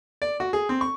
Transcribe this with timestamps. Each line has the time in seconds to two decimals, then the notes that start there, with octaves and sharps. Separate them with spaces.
0.22 D5
0.40 F#4
0.53 G#4
0.69 C4
0.81 C#6